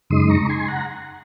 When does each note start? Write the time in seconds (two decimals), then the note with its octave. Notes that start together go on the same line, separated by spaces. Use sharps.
0.10 F#2 C#3 G#3 D#4 C6 D#6
0.29 A#5 C#6
0.49 G#5 C6
0.68 F#5 A#5